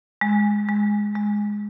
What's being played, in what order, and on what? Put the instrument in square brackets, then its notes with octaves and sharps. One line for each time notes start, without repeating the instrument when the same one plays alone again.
[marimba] G#3
G#3
G#3